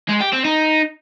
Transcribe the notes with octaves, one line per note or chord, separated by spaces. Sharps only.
G#3
G4
C4
D#4